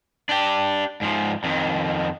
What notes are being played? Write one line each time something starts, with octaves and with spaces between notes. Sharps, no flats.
D4 G4
G#2 F3
F2 D#3